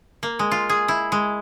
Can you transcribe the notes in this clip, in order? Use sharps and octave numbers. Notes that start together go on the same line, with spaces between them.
A#3
G#3
F4
G#4
E4
G#3